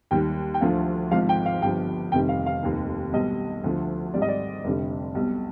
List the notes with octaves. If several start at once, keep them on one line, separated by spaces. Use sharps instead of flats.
D#2 D#3 G3 G5
G5
D2 D3 F3 F5
G#1 G#2 F3 F5
G5
F5
G1 G2 F3 G5
F1 F2 D#3 G3 G5
F5
F5
F1 D#2 D#3
B1 B2 G3 D#5
D2 D3 F3
G#1 G#2 G3 D5
D#5
D5
F1 F2 D3 G3
B1 B2 G3